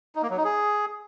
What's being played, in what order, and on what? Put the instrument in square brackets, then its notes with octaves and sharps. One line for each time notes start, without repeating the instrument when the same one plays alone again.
[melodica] D#4
A#3
F#3
D#4
G#4